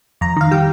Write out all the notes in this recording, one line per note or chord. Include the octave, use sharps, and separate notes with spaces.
F2 A#5
D#3 F5
G3 G5